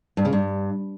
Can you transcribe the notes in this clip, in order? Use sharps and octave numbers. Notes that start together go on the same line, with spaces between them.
G2
C#3
G2